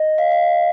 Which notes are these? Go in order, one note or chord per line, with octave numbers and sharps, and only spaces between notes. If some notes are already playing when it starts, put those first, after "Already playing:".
Already playing: D#5
F5
F5